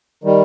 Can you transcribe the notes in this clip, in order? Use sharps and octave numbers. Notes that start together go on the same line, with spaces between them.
D#3 G3